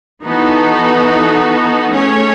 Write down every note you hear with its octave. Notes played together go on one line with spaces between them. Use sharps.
E3 B3 D#4 F#4 A4
A3 C#4 G#4 C#5